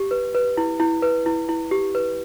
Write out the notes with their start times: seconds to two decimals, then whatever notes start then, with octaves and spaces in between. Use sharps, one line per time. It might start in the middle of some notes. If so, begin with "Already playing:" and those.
Already playing: G4
0.11 B4
0.35 B4
0.57 E4
0.80 E4
1.02 B4
1.26 E4
1.49 E4
1.71 G4
1.95 B4